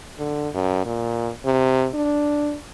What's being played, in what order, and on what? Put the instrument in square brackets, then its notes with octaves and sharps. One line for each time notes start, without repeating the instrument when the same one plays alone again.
[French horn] D3
F#2
A#2
C3
D4